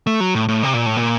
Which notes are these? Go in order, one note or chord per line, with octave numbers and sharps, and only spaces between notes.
A3
F#3
A2
A2
C3
A#2
A2
A#2